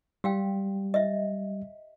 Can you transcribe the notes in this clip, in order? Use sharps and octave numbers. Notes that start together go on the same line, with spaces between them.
G3 G4 F5 G5
D#5 E5